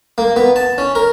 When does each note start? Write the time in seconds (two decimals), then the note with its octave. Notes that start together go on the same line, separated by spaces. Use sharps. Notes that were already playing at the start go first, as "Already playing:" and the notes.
0.18 A#3
0.36 B3
0.56 A5
0.78 C#4
0.95 A#4